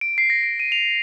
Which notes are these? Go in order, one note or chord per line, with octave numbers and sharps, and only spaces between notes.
D7
C7
A#6
D7
D#7
F7